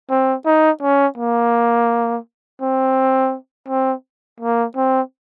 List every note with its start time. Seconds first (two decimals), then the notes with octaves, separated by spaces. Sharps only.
0.10 C4
0.46 D#4
0.82 C#4
1.18 A#3
2.61 C4
3.68 C4
4.40 A#3
4.76 C4